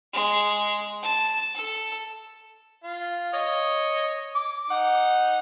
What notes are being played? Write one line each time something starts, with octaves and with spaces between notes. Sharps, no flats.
G#3
A5
A4
F4
C#5 D#5
D6
D#4 F#5